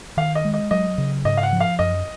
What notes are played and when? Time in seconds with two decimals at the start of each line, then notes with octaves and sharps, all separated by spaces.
0.17 D#3 F5
0.35 D#5
0.45 G#3
0.54 D#5
0.71 F#3 D#5
0.98 C#3
1.25 G#2 D#5
1.37 F5
1.43 F#5
1.52 F3
1.60 F5
1.79 F#2 D#5